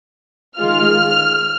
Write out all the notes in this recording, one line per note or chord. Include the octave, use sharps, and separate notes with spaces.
D#3 G#3 F4 F6